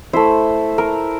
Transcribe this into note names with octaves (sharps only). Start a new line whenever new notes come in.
A3 E4 C5
A#4